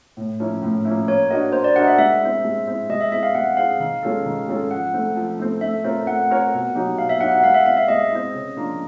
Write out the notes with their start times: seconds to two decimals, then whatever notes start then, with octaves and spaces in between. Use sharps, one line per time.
0.17 A2
0.40 F3 A#3 C#4 E4
0.62 A2
0.85 F3 A#3 C#4 E4
1.08 A#3 C#5
1.30 D4 F#4 A#4 D#5
1.53 A#3 C5
1.64 D5
1.76 D4 F#4 A#4 D#5 F#5
1.87 E5
1.98 G#3 E5
2.22 C4 E4
2.44 G#3
2.67 C4 E4
2.89 G#3 D#5
3.01 E5
3.12 C4 E4 G#4 E5
3.23 F5
3.35 G#3 F#5
3.57 C4 E4 G#4 F5
3.80 D#3 F5
4.03 G#3 C#4 F4 A4
4.26 D#3
4.48 G#3 C#4 F4 A4
4.71 F3 F#5
4.93 A3 C4
5.16 F3
5.39 A3 C4
5.61 A3 E5
5.84 C4 F4 A#4 C#5
6.07 A3 F#5
6.30 C4 F4 A#4 C#5
6.53 B2
6.75 F#3 A#3 D#4 G4
6.98 B2 F5
7.09 E5
7.20 F#3 A#3 D#4 G4 F#5
7.32 F#5
7.44 G#3 F5
7.54 E5
7.66 C4 E4 F5
7.77 E5
7.88 G#3 D#5
8.11 C4 E4
8.34 C#3
8.57 F3 A#3 D4 F4